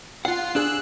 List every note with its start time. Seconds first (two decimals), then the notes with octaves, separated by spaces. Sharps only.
0.25 F4 F#5 C7
0.55 D4 G#4 E6 F#6